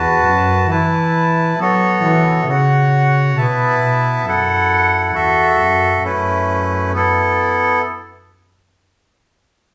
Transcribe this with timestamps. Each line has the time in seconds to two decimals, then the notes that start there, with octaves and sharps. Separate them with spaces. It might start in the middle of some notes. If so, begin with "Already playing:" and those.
Already playing: E2 F#4 B4 A5
0.25 F#2
0.70 E3 E4 B4 A5
1.59 F#3 B3 F#4 A4 C#5
2.04 E3
2.48 C#3 F#4 C#5 F#5
3.37 B2 B3 E4 B4 E5 A5
3.81 B2
4.26 F#2 E4 A4 F#5
5.15 E2 F#4 A4 E5
5.59 F#2
6.03 F#2 A3 C#4 E4 B4
6.93 B3 E4 A4